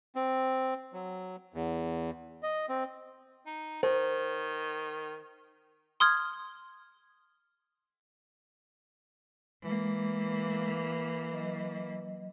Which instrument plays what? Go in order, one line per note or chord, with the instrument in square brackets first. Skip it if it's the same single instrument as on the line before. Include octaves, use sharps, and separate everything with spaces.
[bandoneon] C4
F#3
E2
D#5
C4
[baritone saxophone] D#4
[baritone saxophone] D#3 [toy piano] C5
[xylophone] C6 D#6 F6 G#6
[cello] E3 A#3 [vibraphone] G#3
[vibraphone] F#3 D#5